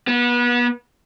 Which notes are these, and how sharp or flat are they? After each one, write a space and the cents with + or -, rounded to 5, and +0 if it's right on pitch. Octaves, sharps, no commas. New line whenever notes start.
B3 -30